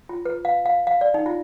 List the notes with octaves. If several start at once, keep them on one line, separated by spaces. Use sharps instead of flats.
F4
B4
F5
F5
F5
D5
D#4
F4